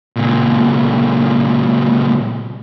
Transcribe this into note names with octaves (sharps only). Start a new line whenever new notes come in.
C#2 A#2